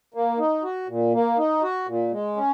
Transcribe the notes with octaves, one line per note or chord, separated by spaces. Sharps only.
A#3
D#4
F#4
A#2
A#3
D#4
F#4
A#2
G#3
C#4